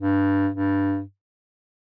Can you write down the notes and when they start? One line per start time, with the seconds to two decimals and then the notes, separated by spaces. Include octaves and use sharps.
0.02 G2
0.54 G2